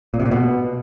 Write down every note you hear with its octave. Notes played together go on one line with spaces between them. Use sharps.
A#2
C3
A#2
B2